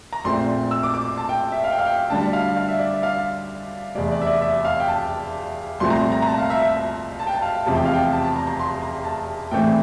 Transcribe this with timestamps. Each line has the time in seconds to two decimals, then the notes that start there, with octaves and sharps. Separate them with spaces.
0.13 A#5
0.24 A#1 A#2 A3 C4 C6
0.71 E6
0.83 D6
0.94 D6
1.17 A5
1.29 G5
1.52 E5
1.64 F5
1.71 G5
1.79 F5
1.86 G5
2.10 D2 D3 G3 A5
2.33 F5
2.57 F5
2.68 E5
2.79 D5
2.91 E5
3.03 F5
3.95 F1 E2 C3 D5
4.11 D5
4.21 E5
4.27 D5
4.42 E5
4.65 F5
4.80 G5
4.88 A5
5.80 C2 A#2 F3 A3 C4 C6
5.90 A#5
5.96 C6
6.12 A#5
6.22 A#5
6.27 A5
6.38 F5
6.50 E5
6.62 E5
6.74 E5
7.19 A5
7.27 G5
7.35 A5
7.42 F5
7.66 F1 E2 C3 F3 C4 A5
7.75 G5
7.85 F5
7.94 G5
8.13 A5
8.24 A5
8.36 A#5
8.47 A#5
8.59 C6
8.82 A#5
9.05 A5
9.51 A#1 A2 E3 A3 C4 G5